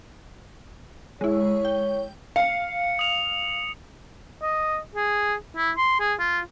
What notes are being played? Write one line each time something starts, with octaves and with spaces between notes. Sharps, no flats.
G#3 E4 C#5
G5
F5 C#7
D#6 F7
D#5
G#4
E4
C6
G#4
F4